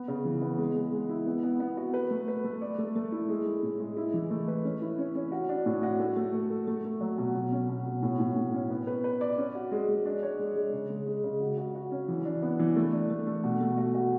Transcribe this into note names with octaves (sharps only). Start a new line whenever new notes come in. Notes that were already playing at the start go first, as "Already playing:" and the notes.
Already playing: B3
C#3
E3
B3
G#3
G#3
G#3
E4
B3
B3
B3
F#4
B4
A3
B4
A3
D5
A3
A3
E4
G#3
G#3
A2
G#3
E4
E3
A3
B4
C#4
E4
C#4
C#4
F#4
D4
A2
F#4
A3
A3
A4
A4
A3
A3
F#3
B2
B2
C#4
B2
B2
A2
A2
A2
C#4
B3
B4
B4
D5
C#4
F#4
G#3
G#3
D4
C#5
G#3
G#3
C#3
G#3
G#3
C#3
F#4
F#4
F#4
C#4
E3
D4
B3
E3
A3
D4
A3
A3
B2
A3
F#4
F#4